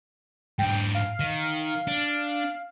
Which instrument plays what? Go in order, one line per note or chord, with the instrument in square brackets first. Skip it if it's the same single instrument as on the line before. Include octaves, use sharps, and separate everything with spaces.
[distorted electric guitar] G#2 D4 [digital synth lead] G5
[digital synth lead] F5
[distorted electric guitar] D#3
D4